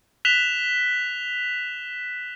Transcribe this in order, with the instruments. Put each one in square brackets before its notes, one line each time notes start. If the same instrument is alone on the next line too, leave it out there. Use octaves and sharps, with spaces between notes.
[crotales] F#6 B6 E7 F7 G7